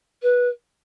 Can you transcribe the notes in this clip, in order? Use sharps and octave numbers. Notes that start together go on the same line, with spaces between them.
B4